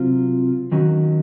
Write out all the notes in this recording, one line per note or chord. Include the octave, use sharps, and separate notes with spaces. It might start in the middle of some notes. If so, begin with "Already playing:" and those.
Already playing: C3 F#3 C4 F4
D#2 D#3 F#3 C#4 F#4